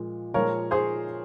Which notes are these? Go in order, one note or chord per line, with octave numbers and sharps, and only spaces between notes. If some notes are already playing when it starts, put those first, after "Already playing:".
Already playing: A#2 F3 G#3
A#2 F3 G#3 A#4 C#5
G#4 C5